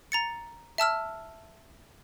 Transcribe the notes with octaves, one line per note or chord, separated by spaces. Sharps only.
A#5 A6 C#7
E5 A5 E6 F6